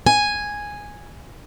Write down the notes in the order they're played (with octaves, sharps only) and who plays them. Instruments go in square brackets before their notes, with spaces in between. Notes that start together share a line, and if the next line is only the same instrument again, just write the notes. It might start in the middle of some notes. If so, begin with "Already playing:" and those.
[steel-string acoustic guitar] G#5